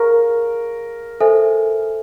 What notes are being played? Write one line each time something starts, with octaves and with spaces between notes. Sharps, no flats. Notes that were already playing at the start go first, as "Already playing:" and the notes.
Already playing: G#4 A#4 C#5 F5 A#5 C#6
A4 C5 E5 G#5